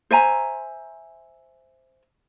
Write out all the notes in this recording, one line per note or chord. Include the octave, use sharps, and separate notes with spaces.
C5 E5 G#5 A#5